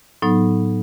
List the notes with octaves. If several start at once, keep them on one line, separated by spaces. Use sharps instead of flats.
A2 F#3 B3 D#4